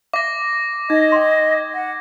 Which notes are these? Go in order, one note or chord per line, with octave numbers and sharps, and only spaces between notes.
E5 D6 A#6
D#4 D#5 G#6
G5 C6
F#5